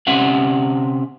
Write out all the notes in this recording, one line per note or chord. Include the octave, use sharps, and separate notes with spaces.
C3 C#4 E5 F#5